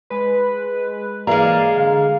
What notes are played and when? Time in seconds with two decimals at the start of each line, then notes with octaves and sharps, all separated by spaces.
0.10 G#3 B4
1.27 E3 G#3 A#3 G#4 D5 F5 A#5
1.77 D3 F5